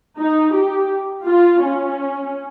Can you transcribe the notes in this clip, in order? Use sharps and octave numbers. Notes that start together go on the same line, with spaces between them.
D#4
G4
F4
C#4